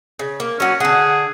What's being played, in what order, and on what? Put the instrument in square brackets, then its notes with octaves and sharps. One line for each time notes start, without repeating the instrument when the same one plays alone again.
[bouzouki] C#3
A#3
[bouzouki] F#3 F#4 [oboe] C#4
[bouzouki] D3 F#5 [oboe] G#4